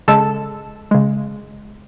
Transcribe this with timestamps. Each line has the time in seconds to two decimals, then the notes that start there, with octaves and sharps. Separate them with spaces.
0.08 C#3 G#3 A4 A5
0.91 C#3 G#3